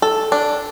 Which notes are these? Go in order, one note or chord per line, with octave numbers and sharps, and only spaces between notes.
A4
D4